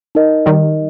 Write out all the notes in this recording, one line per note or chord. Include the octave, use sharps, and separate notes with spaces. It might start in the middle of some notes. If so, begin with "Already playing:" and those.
D#4 A#4 D#5
D#3 G3